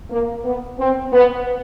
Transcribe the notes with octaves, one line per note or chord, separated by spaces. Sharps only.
A#3
B3
C4
B3